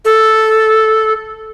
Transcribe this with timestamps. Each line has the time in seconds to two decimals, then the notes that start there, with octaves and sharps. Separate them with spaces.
0.05 A4